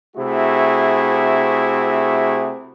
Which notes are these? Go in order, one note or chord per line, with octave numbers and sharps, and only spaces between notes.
C3 A3 E4 F#4 G#4